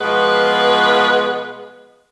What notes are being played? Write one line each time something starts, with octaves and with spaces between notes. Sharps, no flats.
B2 F3 G#3 B3 B4